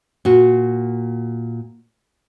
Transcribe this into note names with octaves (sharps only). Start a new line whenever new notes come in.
A#2 F#4